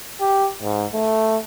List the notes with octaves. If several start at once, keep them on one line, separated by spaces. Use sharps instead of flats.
G4
G#2
A3